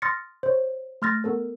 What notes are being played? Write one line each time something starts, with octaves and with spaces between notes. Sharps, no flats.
C6 D#6 F6 A6 A#6 C#7
C5 C#5
A3 C6 F6 G6 A6 A#6
B3 A4 A#4